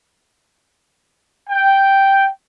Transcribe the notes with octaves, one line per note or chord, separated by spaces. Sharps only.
G5